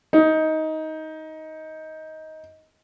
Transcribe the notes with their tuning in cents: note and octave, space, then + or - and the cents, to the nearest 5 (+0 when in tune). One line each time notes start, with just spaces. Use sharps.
D#4 +15